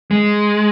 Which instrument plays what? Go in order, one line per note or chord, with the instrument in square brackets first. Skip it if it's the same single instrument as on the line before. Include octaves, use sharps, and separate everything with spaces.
[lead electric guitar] G#3